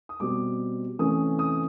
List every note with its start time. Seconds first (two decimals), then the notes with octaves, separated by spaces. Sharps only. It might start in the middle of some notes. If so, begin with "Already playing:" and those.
0.09 D#6
0.20 B2 G3 C4 D6
0.99 C3 E3 A3 C#4 D#6
1.39 D#6